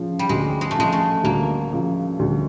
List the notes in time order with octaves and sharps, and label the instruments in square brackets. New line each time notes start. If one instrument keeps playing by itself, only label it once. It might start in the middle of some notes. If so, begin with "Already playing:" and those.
Already playing: [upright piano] C#3 F3
[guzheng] G3
[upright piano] D2 [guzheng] G#3
[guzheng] G#3
A3
[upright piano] C#3 F3 [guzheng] G#3
[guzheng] A3
[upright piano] D2 [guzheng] A#3
[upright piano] C#3 F3
D2